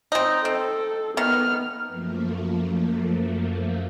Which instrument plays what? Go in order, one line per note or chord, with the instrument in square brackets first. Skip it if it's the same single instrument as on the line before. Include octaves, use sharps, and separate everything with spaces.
[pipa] C4 D#4
[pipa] C4 [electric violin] A4
[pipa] D#3 [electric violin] B3 F6
[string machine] F#2 F3 A3 A#3